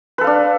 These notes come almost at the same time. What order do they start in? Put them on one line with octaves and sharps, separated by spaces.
B4 A4 F5 D4